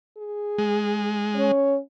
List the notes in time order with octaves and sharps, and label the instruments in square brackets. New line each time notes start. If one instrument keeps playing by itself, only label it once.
[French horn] G#4
[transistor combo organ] G#3
[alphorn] C#4 [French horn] C#5